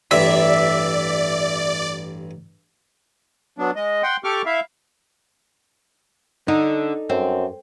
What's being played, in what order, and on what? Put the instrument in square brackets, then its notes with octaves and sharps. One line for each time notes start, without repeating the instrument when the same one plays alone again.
[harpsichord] A1 G2 [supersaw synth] D5 [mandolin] E5
[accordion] F#3 B3 D4
G#3 D#5
F#5 G5 C6
G4 A4 C#6 D6 F6
E4 E5 F5
[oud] D3 [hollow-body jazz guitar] D#4
[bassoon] F#2 [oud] C4